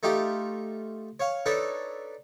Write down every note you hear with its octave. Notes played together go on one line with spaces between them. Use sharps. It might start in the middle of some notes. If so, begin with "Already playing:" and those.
A3 D#4 F4 G4
C#5 F5
D4 D#4 A4 B4 C#5